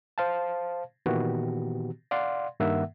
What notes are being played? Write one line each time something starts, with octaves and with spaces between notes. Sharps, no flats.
C5 F5 A5
A#2 D#3 E3 B3 F#4 G4
D5 F5 F#5 C6
G2 D#3 A#3 E5 F#5